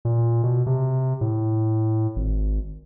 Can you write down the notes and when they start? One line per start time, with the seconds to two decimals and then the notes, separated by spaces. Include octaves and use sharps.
0.05 A#2
0.44 B2
0.67 C3
1.21 A2
2.16 G#1